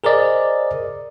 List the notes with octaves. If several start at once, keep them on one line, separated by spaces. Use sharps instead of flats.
G#4 A#4 C5 D5 D#5